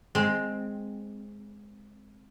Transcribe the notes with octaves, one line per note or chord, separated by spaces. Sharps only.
G#3 C4